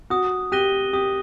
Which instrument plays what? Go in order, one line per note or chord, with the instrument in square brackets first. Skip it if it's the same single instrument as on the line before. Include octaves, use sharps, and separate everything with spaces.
[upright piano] F#4 [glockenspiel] D#6
[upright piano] G4 [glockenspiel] F#6 A#6 D#7 G7
[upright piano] G4 [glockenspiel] D#6